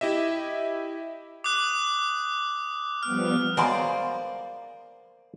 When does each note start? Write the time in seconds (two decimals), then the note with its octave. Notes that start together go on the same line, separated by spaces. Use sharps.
0.01 E4 G4 D#5 E5
1.44 D6 D#6 F#6
3.03 F3 G3 B3 F6
3.57 F#3 G#3 A#3 B3 C5 D5